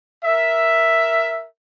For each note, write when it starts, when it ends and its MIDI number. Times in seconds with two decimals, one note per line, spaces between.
0.24 1.45 70
0.24 1.45 76